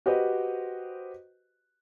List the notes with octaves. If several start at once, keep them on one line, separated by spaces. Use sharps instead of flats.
F#4 G4 B4 C5 D#5